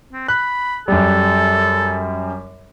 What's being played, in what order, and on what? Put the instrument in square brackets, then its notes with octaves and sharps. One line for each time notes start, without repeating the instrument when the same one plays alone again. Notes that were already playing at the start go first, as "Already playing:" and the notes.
[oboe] C4
[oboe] B5 [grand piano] F#6
[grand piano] F#2 G3 [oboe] A4